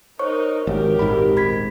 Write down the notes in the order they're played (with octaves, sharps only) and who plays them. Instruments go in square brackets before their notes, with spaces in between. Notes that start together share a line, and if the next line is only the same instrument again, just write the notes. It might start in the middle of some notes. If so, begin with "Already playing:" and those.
[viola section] D#4 A#4 [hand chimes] C5 C#5 C#6
[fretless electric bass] G#1 [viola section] G4 A#4 [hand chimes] C#5
[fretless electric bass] D#1 G#1 G#2 [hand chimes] B5
[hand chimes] B5 G#6 B6